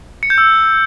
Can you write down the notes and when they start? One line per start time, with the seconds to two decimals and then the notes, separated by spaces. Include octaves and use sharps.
0.23 C#7
0.30 G6
0.38 E6